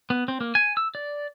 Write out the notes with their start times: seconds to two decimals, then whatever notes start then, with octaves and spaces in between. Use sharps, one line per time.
0.10 B3
0.28 C4
0.41 A#3
0.55 G#5
0.77 E6
0.95 D5